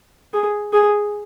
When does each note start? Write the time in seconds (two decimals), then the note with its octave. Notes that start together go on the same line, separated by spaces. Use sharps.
0.33 G#4
0.73 G#4